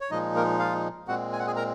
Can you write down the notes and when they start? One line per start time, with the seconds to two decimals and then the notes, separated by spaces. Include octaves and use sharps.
0.01 C#5
0.11 A#2 F3 G#3 D#4 D#5
0.36 A#3 A#4
0.59 F4 F5
1.08 A#2 G#3 C4 F#4 F#5
1.32 G#5
1.39 F#5
1.47 G#4 G#5
1.56 A#4 A#5